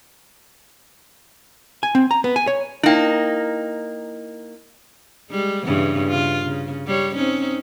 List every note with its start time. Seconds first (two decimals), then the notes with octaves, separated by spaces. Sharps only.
1.83 G#5
1.95 C4
2.11 A#5
2.24 B3
2.36 G#5
2.47 C#5
2.83 A#3 D#4 E4 G5
5.31 G3 G#3
5.65 G2 C#3 E3
6.08 C#3 F4
6.45 C#3
6.87 G3 C#5
7.16 C4 C#4 D#4